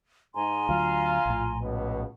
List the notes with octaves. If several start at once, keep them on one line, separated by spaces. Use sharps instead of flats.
G#2 G#5 A#5 C6
D2 F#3 F4 F5
A#1 A2
C#2 B2